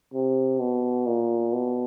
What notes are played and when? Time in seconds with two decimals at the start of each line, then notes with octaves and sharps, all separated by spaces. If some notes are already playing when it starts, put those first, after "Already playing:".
0.14 C3
0.60 B2
1.06 A#2
1.53 B2